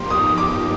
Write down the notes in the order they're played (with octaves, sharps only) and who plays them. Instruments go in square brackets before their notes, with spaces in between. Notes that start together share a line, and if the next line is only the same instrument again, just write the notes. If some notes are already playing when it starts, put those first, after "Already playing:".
Already playing: [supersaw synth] G2 F3 A#3 D#4 G4 [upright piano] C6
[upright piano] D#6
D6